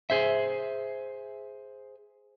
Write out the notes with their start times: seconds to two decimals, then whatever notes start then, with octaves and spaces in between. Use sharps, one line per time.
0.10 G#4 C5 E5